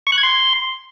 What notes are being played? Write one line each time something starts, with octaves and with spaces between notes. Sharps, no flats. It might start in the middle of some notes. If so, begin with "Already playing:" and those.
C#6
F#6
G#6
C6